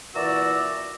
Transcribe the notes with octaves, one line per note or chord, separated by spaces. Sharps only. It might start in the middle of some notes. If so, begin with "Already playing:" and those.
A#2 E3 F#4 D5 A#5 E6